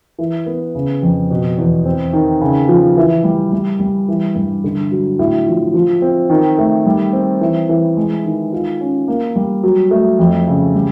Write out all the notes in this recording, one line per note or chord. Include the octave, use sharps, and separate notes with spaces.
E3
B3
C#3
F2
B2
E2
C4
D#3
C#3
F3
E3
G3
G3
G3
E3
G2
D3
F#3
A2
F3
F3
C4
D#3
A3
G3
C4
E3
E3
G#3
D#3
F4
C#4
A#3
G3
F#3
A3
F2
C#3
G3